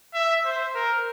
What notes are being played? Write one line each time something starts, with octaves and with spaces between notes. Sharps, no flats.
E5
C5
A#4